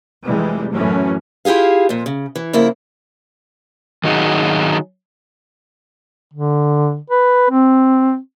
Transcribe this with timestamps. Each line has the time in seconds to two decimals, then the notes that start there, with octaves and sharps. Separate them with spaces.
0.24 F1 C3 E3 G3 G#3
0.73 F#2 A2 E3 F#3 A3 C#4
1.45 E4 F4 G4 G#4 F5
1.89 F2 A#2
2.06 C#3
2.35 E3
2.53 F2 C#3 A#3 E4
4.04 D#3 F#3 D#4 F#4 G#4
6.33 D3
7.10 B4
7.50 C4